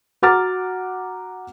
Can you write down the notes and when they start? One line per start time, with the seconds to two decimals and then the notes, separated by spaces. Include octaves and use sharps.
0.22 F#4 F#5 A#5 D6 F6 A6